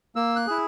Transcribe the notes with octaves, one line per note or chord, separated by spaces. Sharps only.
A#3 E6
F#6
E4 G#4